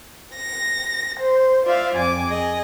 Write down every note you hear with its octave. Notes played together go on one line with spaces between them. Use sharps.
A#6
C5
F4 C5 D5 E5 F5
F2 G#5 D6
G#4 D#5